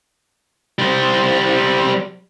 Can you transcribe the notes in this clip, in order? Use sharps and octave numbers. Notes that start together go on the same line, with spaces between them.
G3 C5